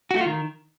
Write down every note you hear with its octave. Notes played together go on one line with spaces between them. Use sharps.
F#4
A3
F4
D#3